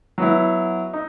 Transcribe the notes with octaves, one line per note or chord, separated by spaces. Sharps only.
F#3 B3 E4
D#4